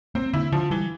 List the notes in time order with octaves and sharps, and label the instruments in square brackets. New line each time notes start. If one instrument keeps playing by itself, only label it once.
[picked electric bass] A#3 [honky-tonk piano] C4
[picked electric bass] D3 [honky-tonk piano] E4
[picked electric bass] D3 [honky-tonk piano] F3
[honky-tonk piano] E3 [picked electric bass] G3